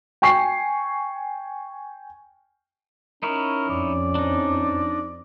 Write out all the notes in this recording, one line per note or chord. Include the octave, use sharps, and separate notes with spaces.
G5 G#5 C#6 C7
C#4 D#4 E4 A#4 C#5
F2 D5
D4 D#4